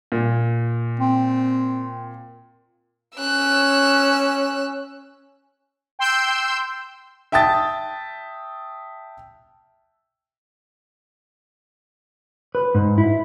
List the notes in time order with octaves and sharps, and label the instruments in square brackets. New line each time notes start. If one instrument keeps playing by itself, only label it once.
[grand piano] A#2
[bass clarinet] C4
[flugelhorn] C#4 [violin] E6 F#6
[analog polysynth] G5 C6 E6 G6
[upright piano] E5 G5 A5 D#6 A6
[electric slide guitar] B4
G#2
E4